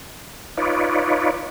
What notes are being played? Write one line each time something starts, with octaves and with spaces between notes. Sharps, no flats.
D#4 F4 B4 C#5 D5